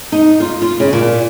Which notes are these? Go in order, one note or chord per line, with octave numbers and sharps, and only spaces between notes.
D#4
F4
F4
C#3
A#2